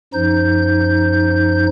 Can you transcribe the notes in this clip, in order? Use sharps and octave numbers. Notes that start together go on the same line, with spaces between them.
F#2 F3 D#4 G6